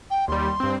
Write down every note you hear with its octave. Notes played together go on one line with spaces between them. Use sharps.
G5
D#2 G3 C6
G2 C4